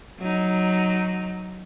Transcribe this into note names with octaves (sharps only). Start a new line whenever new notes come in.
F#3 D#4